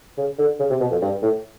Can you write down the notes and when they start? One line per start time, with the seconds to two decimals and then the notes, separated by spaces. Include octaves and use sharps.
0.18 C#3
0.39 D3
0.59 C#3
0.70 C3
0.80 B2
0.91 F2
1.02 G2
1.22 A2